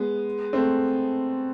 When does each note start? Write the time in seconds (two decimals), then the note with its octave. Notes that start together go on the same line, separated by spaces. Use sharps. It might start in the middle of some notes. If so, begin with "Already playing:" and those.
Already playing: G#3 B3
0.53 A3 C4